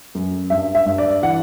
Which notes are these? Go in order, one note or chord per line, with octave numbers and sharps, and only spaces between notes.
F#2
G2 E5
E5
G2
D5
E3 F#5